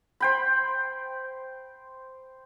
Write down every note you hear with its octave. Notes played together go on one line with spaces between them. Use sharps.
C5 G5 B5